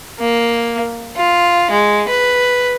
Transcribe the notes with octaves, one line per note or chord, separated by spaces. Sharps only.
A#3
F4
G#3
B4